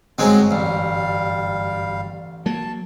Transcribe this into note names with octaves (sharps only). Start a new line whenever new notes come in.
G1 F#2 F#3 G#3 C4 D#5 F#5
A1 G3 F5
F#3 A#3 A5